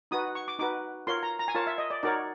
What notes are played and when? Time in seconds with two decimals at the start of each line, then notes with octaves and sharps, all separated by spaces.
0.11 D#4 F#4 B4 D#6
0.35 C#6
0.48 D6
0.59 D#4 F#4 B4 D6
1.07 F4 A#4 C#5 C6
1.23 A#5
1.39 A#5
1.48 G#5
1.55 F4 A#4 C#5 A5
1.67 E5
1.78 D#5
1.90 D5
2.03 D#4 F#4 A#4 C#5 D5